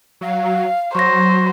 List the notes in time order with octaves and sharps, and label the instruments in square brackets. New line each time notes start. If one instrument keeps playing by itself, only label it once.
[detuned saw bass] F#3 [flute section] F5
[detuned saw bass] F#3 [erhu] C5 [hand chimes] C#6 A#6